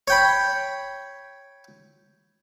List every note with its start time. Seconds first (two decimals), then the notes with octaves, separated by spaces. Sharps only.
0.08 C#5 G5 B5